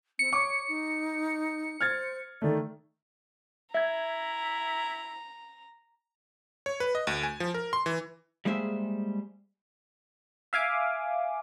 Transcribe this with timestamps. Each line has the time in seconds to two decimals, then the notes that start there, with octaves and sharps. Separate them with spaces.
0.19 C4 C#7
0.33 C#5 C#6 D6
0.68 D#4
1.81 C5 F6 G#6 A6
2.42 D#3 A3 D5
3.75 E4 E5 A#5 G#6
6.66 C#5
6.80 B4
6.95 D#5
7.07 D2
7.23 G#5
7.40 F3
7.54 A#4
7.73 C6
7.86 E3
8.45 G3 G#3 A#3 G#4 C5 E5
10.53 E5 F5 G#5 D6